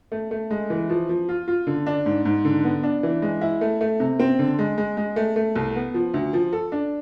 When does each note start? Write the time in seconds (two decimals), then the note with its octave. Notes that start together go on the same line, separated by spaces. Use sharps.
0.12 A3
0.31 A3
0.51 G#3
0.70 E3
0.90 F3
1.09 F3
1.29 F4
1.48 F4
1.67 D3
1.87 D4
2.06 G#2
2.25 G#2
2.45 D3
2.64 B3
2.83 D4
3.03 E3
3.22 G#3
3.41 E4
3.61 A3
3.81 A3
4.00 C3
4.19 C4
4.39 D3
4.59 G#3
4.78 G#3
4.97 G#3
5.16 A3
5.36 A3
5.56 C2
5.75 B3
5.94 F3
6.14 D2
6.33 F3
6.53 A4
6.72 D4